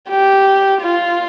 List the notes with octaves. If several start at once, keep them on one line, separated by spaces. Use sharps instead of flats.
G4
F4